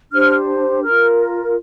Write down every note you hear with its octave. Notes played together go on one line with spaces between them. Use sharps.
D4 G4 C5 F6
F4 A#4 F6